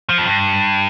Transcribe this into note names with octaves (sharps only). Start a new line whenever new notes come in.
F3
F2
G2